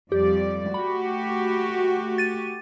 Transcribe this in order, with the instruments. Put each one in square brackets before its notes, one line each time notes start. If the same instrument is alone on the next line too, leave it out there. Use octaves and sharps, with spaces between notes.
[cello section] F2 G3 D5 [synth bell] G4
[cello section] A3 F#4 G4 [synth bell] B5
[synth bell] A6 D#7